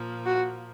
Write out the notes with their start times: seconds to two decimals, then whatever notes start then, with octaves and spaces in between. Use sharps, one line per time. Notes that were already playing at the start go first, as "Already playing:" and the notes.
Already playing: A#2 F3 A#3
0.26 F#4